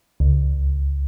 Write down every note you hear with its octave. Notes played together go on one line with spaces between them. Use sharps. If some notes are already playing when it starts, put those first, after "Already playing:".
C#2